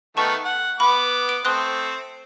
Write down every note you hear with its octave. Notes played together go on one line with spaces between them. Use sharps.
D#3 A3 B3 A5 C#6
F#5
B3 B5 D6
D7
A3 C4 C6 D#6 F#6